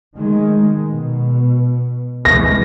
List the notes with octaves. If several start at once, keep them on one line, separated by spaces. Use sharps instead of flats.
D#3 G#3
B2
C3 E3 G#3 A#6